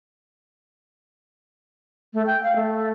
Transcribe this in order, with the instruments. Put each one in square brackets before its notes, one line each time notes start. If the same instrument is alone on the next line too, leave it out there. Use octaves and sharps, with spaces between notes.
[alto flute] A3
G5
F5
A3